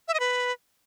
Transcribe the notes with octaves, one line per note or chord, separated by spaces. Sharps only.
E5
D#5
B4